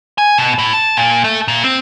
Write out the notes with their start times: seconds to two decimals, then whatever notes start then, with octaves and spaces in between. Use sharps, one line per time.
0.18 G#5
0.38 B2
0.59 A2
0.73 A5
0.97 A#2
1.24 A3
1.48 A#2
1.64 C4